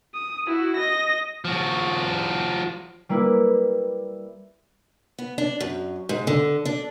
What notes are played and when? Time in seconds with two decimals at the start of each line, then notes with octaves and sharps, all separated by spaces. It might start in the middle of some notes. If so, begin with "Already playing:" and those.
0.14 D#6
0.47 E4 F#4
0.76 D#5 A#6
1.45 F3 F#4
3.09 G3 A#3 E4 B4
5.19 B3
5.38 D4
5.60 F#2
6.09 G#2
6.27 D3
6.65 D4